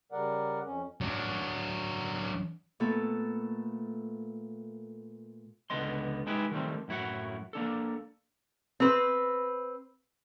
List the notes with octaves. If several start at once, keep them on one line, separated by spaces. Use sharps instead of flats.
C#3 G3 A#4 D5 F#5
F2 C#4
F#3 D4
A#2 A3 B3 A4
C#2 D3 B3 D#5 C6
G#3 D#4 E4 G4 G#4 B4
D#3 F#3 G3 A3 C4
F#2 A2 E4 F#4 F#5
A#3 D4 A4
C4 B4